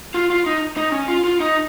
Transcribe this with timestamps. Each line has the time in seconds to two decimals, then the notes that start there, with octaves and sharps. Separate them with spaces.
0.14 F4
0.30 F4
0.46 D#4
0.77 D#4
0.92 C#4
1.08 F4
1.24 F4
1.40 D#4